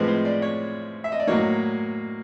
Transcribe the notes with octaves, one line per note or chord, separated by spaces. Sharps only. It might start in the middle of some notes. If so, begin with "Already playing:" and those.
Already playing: A2 F3 G#3 C4 B4
C5
D5
C#5
E5
D#5
D5
A2 F#3 A#3 C#5